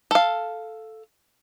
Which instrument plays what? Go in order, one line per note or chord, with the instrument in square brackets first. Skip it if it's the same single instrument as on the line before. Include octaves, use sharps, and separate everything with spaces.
[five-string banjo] A4 F5